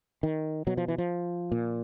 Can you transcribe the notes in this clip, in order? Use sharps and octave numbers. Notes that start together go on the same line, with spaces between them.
D#3
B2 F#3
F3
E3
F3
A#2